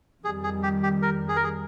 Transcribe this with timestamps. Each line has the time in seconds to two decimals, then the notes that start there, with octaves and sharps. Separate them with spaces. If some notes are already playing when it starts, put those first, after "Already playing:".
0.24 F2 D#3 G3 G#4
0.44 G#4
0.63 G4
0.83 G4
1.02 A#4
1.28 G#4
1.36 A#4
1.44 G#4